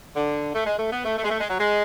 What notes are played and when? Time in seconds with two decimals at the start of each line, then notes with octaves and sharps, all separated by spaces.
0.16 D3
0.54 A3
0.66 G#3
0.78 A3
0.92 B3
1.05 A3
1.18 A3
1.24 G#3
1.30 A3
1.40 G#3
1.49 F#3
1.59 G#3